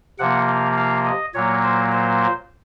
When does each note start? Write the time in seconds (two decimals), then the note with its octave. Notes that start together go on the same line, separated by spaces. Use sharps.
0.19 C3 F3 A#3 F#5
0.48 F5
0.77 F5
1.05 D#5
1.34 A#2 F#3 A#3 C#5
1.64 C5
1.92 C5